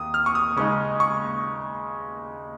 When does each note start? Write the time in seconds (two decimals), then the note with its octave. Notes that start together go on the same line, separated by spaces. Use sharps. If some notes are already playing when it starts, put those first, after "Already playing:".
Already playing: D#2 D#3 D#6
0.14 F6
0.26 C#6
0.35 D#6
0.56 C#3 G#3 D#4 C#6
1.00 C#6